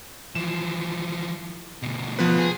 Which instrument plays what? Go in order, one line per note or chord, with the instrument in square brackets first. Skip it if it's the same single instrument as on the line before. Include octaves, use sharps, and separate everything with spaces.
[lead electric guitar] E3 F3 [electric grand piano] E7
[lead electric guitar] D2 B2
[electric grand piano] F3 B3 B4
[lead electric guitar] G#4